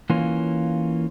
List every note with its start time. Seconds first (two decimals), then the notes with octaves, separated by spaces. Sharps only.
0.10 E3 A#3 C#4 F4